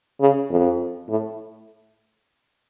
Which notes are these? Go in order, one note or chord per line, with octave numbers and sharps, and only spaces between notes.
C#3
F2
A2